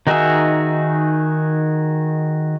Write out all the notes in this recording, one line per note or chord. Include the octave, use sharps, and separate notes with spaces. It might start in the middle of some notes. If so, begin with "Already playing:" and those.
D#3 D#4 F#4 G#4 E5